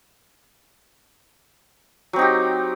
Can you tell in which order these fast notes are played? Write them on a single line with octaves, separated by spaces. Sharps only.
F#3 C4 D#4 G4